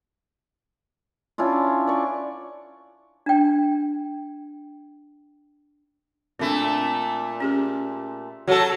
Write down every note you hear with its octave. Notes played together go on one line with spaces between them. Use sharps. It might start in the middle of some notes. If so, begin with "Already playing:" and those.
C#4 D4 E4 F4
D5 C#6
D4 G5
A#2 A3 C4 D4
C#4 G4 G#4
F#3 F#4 G#4 A4 F#5